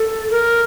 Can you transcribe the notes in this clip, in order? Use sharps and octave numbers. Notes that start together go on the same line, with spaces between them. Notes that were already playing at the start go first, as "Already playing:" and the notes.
Already playing: A4
A#4